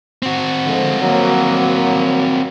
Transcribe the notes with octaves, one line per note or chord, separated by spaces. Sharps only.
C4 F#4
D3 F3 G#3
F3 F#3 A#3